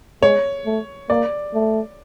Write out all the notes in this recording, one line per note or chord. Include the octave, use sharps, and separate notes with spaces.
G#3 C#5
A3
A#3 D5
A3